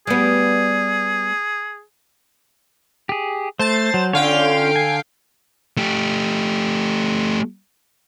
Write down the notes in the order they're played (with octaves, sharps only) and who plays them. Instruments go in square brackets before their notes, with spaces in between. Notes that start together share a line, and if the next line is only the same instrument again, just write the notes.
[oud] G3 B3 [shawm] G#4
[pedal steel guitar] G4 G#4
[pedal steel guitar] A3 [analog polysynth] C5 A5 A6
[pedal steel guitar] F#3
[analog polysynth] D3 F5 G5 [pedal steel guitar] C#4 F4 C#5
[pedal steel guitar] G#5
[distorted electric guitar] A3 G4